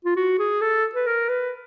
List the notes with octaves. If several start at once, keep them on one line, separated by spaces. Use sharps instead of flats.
F4
F#4
G#4
A4
B4
A#4
B4